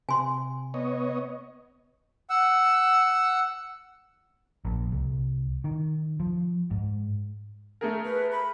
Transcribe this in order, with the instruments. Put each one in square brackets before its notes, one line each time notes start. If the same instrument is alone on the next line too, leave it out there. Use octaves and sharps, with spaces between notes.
[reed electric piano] C3 [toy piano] G#5 C6
[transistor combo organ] B3 C#5 D#5
[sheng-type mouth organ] F#5 E6
[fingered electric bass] A#1
C2
D#3
F3
G#2
[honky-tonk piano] A3 G#4 A#4
[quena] B4
B5